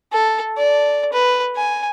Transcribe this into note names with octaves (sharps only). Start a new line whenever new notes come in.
A4
D5
B4
G#5